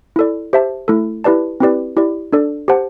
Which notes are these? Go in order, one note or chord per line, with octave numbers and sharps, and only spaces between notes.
E4 A4 D5
G4 C5 E5 A5
A3 E4 A4
E4 G4 B4 D5 A5
C4 E4 G4 B4 D5
E4 G4 D5
D4 A4 D5
G4 C5 F#5 A5